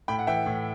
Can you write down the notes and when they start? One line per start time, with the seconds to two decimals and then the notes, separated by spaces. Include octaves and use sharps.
0.08 A2 G5 B5
0.19 F#5
0.27 E3 E5 G5
0.46 A2